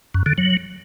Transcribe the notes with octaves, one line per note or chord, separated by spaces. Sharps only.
F#2
D3
F#3